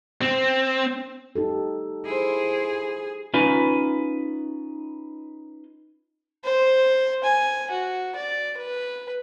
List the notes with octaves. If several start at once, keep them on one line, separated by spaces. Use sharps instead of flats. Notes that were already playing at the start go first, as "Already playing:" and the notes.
C4
D#4 G4 A4
E4 G#4 C5
C#4 D#4 F4 B4
C5
G#5
F#4
D5
B4